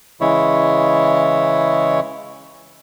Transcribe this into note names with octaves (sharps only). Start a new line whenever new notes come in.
C#3 E3 G#3 E4 C#5